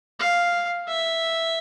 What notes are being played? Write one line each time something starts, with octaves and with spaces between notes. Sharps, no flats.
F5
E5